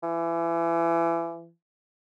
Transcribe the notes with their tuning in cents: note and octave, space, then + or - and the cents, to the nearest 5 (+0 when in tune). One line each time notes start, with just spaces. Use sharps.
E3 +30